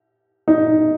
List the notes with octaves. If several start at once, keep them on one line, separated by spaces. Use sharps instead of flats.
D#4